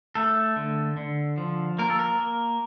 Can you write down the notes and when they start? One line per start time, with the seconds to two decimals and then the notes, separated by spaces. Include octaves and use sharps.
0.15 A3 A4
0.56 D3
0.97 D3
1.38 F3
1.78 A#3 A#4
1.90 A4
1.99 A#4
2.19 A#3